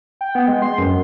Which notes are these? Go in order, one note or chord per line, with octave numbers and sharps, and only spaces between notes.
G5
B3
G#3
C6
F#2